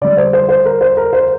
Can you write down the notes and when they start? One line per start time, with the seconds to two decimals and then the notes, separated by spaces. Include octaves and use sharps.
0.01 D3 G3 D5
0.17 C5
0.33 C5
0.49 C5
0.65 A#4
0.81 C5
0.97 A#4
1.13 C5